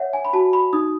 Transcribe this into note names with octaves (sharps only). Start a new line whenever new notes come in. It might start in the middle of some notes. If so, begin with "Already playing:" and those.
Already playing: C#5 E5 F#5
G#5
B5
F#4 A5
B5
D#4 D#6